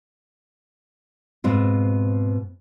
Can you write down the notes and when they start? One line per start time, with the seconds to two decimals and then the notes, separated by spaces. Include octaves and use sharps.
1.44 G#2 B2 C4 F4